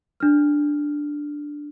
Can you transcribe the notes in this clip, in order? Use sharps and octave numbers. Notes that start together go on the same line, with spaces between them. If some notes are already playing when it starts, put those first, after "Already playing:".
D4 F6